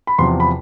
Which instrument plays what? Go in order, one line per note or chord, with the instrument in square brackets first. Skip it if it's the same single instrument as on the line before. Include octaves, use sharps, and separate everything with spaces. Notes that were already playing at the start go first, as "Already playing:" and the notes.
[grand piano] B5
E2 C3 F3 C6
B5